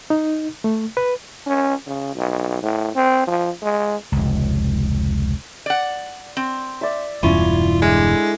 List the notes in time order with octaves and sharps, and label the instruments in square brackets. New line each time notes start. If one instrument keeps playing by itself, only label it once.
[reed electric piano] D#4
A3
B4
[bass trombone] C#4
C#3
B1
A2
C4
F3
G#3
[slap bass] F1 C#2
[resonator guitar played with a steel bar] D5 F#5
C4
[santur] D5 E5
[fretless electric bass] E1 E2 G2 [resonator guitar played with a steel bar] C#4 [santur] E4 [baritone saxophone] F4
[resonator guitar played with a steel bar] D3 [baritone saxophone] G#3 [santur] E5